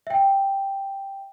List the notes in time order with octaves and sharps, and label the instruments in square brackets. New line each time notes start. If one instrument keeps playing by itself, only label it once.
[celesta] E5 G5